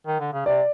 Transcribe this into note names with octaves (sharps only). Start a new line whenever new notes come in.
D#3
D3
C#3
C3 D5